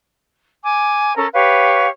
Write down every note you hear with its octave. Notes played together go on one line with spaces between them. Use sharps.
G#5 D6
C#4 A4 A#4
G4 B4 C#5 F5